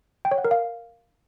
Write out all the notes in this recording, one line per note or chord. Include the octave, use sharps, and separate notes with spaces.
G5
C#5
F#5
A#4
F5